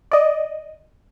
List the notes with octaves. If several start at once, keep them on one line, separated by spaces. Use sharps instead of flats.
D5 D#5